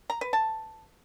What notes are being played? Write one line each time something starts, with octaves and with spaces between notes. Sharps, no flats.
A#5
B4
A5